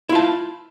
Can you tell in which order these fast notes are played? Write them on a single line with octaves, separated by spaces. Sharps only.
E4 F4 A5